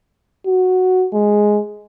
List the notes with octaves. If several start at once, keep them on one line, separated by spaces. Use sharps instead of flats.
F#4
G#3